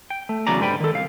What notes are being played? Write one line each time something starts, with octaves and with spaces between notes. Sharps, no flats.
G5
A3
E2 C#3 F#3 B3 D5 A#5
G#2 D3 G3 B4 G5 B5
D#3 A4
C2 F5